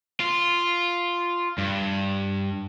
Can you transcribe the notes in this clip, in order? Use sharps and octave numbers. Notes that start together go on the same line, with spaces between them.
F4
G2